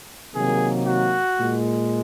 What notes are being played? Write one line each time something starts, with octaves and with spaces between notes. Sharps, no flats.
C3 D#3 F#3 A#3 G#4
F#4
A#2 G#3